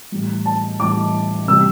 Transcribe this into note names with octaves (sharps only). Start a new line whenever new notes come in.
A2 E3 G3
A5
A2 E3 G3 D6
C3 E3 G3 E6